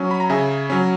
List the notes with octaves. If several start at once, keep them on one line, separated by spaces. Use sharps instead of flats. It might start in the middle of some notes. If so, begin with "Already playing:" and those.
Already playing: F#3 C#4
B5
A#5
C#3 E5 G#5
F#3 C#4